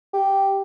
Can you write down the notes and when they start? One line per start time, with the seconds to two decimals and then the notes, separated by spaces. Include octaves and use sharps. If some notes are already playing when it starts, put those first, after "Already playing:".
0.14 G4